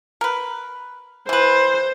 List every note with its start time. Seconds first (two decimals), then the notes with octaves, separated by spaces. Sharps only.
0.21 A#4 B4
1.29 E3 B4 C5